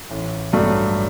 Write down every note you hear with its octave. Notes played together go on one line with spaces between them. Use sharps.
A1
G2 F#3 A3 D4